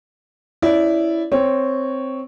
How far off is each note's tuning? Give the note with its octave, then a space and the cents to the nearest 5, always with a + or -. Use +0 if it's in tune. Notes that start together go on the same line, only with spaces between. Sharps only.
C#4 +0 E4 +0 D5 -15
C4 +0 C#5 +0